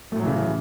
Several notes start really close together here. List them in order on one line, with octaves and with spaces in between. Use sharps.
A3 A2 F#3 E3 C#3